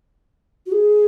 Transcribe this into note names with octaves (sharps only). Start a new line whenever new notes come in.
F#4
G#4